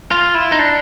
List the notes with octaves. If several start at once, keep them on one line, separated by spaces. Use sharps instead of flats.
F4
E4
D#4
D4